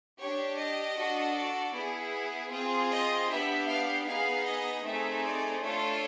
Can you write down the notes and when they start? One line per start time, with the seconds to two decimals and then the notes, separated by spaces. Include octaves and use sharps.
0.19 D4 G4 C#5
0.57 D#5
0.97 D4 F#4 A4
1.35 D5
1.74 B3 E4 G#4
2.52 C4 F4 G#4
2.91 D#5
3.29 B3 D4 G4 E5
3.68 F5
4.06 B3 D#4 G#4 F5
4.45 D#5
4.84 A3 C4 D#4 G#4 E5
5.23 D5
5.62 A3 D4 F4 A4 C#5